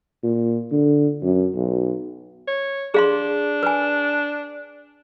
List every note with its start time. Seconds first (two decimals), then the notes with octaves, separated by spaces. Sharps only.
0.23 A#2
0.72 D3
1.23 F#2
1.55 B1
2.48 C#5
2.94 D4 G#4 F5 C6
3.63 B4 G#5